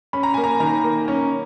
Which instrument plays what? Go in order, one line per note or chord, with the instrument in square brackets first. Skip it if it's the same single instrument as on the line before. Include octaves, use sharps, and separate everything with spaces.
[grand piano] C#4 [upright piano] B5
[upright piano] A#5
[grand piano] A#3 [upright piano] G#5
[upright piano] A#5
[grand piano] D#3 [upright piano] A#5
[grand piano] A#3
C#4